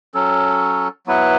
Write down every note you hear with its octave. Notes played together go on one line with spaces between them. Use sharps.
F#3 C#4 A4
F#3 B3 E4 B4